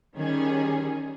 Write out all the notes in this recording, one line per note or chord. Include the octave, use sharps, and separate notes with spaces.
D#3 G3 C#4 G#4